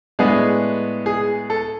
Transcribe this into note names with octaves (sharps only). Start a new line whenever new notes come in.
A2 G#3 B3 D4 G#4
G#4
A4